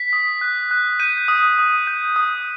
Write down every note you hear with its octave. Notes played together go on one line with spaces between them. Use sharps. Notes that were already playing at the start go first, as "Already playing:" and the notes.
Already playing: B6
D#6
F#6
F#6
G6 D#7
D#6
D#6
G6
D#6